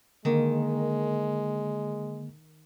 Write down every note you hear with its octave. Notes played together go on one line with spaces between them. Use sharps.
D3 D#3 G#3 A#3